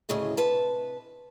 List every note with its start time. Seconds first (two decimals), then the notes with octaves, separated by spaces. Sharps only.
0.09 D2 A2 C#3 G#4 D#5
0.37 C3 B4 A5